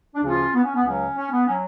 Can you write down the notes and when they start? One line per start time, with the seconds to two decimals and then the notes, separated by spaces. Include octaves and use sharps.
0.15 D4
0.24 D2 C#3 F3 C#4 F4
0.54 B3
0.64 C#4
0.75 B3
0.85 C#2 C#3 F#3 C#4
1.15 C#4
1.31 B3
1.46 F#3 C#4